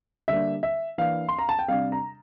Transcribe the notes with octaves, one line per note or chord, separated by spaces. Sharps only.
D3 G3 A#3 D4 E5
E5
E3 A#3 D4 F5
C6
A#5
A5
G5
C3 G3 D4 F5
A#5